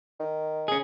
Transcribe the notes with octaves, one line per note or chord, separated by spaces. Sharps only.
D#3
C#4 G#4